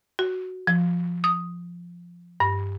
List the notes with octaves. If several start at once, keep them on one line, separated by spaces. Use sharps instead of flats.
F#4
F3
D#6
G2